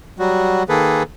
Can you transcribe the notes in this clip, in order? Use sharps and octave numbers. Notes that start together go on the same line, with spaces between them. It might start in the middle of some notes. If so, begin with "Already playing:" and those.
F#3 G3 F#4
D#3 A#3 G#4 A4 B4